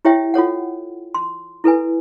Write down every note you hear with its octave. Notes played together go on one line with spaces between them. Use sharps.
E4 G4 C#5 E5 G5
F4 A4 C#5 F#5
C6
E4 A4 B4 G#5